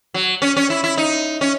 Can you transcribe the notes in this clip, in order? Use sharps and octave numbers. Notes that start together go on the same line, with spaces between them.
F#3
C#4
C#4
E4
E4
D#4
C#4